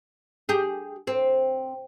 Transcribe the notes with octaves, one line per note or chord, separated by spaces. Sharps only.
G4 G#4
C4